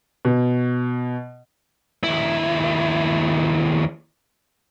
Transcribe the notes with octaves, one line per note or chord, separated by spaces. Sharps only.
B2
D#2 E4